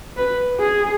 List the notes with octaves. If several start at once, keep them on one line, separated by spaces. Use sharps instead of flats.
B4
G#4